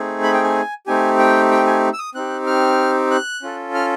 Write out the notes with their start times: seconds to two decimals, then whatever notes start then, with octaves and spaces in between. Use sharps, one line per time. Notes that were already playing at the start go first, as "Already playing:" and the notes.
Already playing: A3 C4 D#4 G#4
0.23 B5
0.34 G5
0.44 G#5
0.87 A3 C4 D#4 G4 G#5
1.19 G5
1.51 G5
1.67 G#5
1.93 E6
1.99 D#6
2.15 C4 D#4 G4 F#6
2.47 F6
3.11 F#6
3.42 C#4 F4 A4
3.75 F6